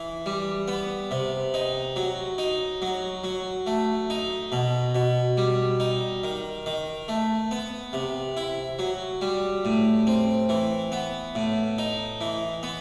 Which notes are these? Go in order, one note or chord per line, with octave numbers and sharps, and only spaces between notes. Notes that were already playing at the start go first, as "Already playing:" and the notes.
Already playing: E3
G3
B3
C3
D#4
F#3
D#4
F#3
F#3
A3
D#4
B2
B2
G3
D#4
D#3
D#3
A3
B3
C3
E4
F#3
G3
A2
C4
E3
B3
A2
D#4
E3
B3